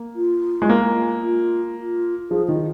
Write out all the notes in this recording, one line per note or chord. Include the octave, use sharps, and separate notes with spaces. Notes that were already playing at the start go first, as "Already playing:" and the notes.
Already playing: A#3
F4
G#3
A#3
F4
F4
F3 G#4
D#3 F4